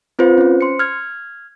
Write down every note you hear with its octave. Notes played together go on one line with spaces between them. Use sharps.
C4 F4 B4 C5
C#4 C5
C6 C#7
F6 G#6